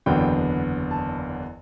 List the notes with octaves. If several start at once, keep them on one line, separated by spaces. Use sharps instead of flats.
F#1 E2 D3 F#3 B3 G5
A5